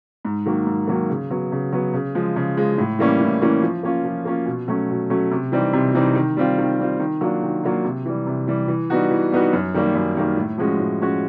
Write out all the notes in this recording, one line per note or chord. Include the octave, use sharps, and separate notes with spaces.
G#2
D#3 F#3 A#3
G#2
D#3 F#3 A#3
C#3
F#3 B3
C#3
F#3 B3
C#3
F3 G#3
C#3
F3 G#3
A2
E3 G3 A#3 C#4
A2
E3 G3 A#3 C#4
F3
A#3 C#4 F4
F3
A#3 C#4 F4
B2
F#3 A3 C#4
B2
F#3 A3 C#4
C3
E3 G3 C4 D#4
C3
E3 G3 C4 D#4
D#3
G3 C4 F4
D#3
G3 C4 F4
D#3
F#3 A#3 D4 F4
D#3
F#3 A#3 D4 F4
C3
E3 G3
C3
E3 G3
E3
G3 B3 D#4 F#4
E3
G3 B3 D#4 F#4
F#2
D#3 G3 A#3
F#2
D#3 G3 A#3
A2
F3 G#3 C#4 F#4
A2
F3 G#3 C#4 F#4